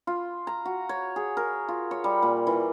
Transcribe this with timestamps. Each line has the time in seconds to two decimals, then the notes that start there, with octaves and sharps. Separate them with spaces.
0.07 F4
0.47 A#5
0.65 F#4
0.89 C#5
1.16 G#4
1.37 A#4
1.68 F4
1.91 C#5
2.04 G3
2.22 A#2
2.47 E3